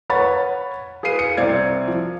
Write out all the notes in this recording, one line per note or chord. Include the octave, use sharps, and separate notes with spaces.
B4 C#5 F#5 B5 C#6 A6
G#4 B4 F5 C7 D#7
C#7
C2 C4 D5 G#6
F3